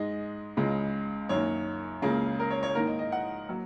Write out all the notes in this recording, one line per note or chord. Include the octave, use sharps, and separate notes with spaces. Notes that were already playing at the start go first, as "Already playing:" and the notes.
Already playing: G#2 G#3 D#5
C#2 C#3 G#3
F#2 D#3 A#3 C#5
C#2 C#3 A#3 G#4
A#4
C#5
C#5
G#2 D#3 A#3 A#4
D#5
D#5
F#5
F#3 A#3